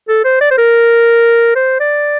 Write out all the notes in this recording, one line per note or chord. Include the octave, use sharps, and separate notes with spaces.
A4
C5
D5
C5
A#4
C5
D5